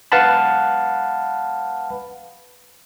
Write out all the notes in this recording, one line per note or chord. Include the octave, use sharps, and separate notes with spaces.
B4 F5 F#5 A5 B5